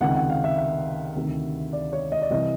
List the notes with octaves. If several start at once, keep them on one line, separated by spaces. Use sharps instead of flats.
C#2 C3 D#3 F#5
F#5
F5
E5
E5
D2 C3 D#3
D5
C#5
D#5
D5
C2 C3 E3 D#5